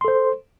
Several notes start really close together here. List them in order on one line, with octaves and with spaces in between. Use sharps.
C6 A4 C5